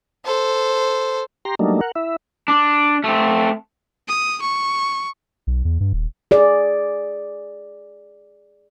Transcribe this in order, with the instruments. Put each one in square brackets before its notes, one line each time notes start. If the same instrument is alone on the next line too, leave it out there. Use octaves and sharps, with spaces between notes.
[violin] A4 C5
[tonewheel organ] G4 A#5 C6
F#3 G3 A3 A#3 D4 D#4
A#4 F#5
E4 E5
[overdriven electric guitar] D4
A3 C4
[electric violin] D#6
C#6
[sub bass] B1
E2
G2
D#1
[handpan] G#4 D5